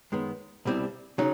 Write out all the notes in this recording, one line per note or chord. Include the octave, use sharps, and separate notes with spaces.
F#2 D#3 G#3 B3
C2 B2 G3 C4 E4
C#3 F#3 D#4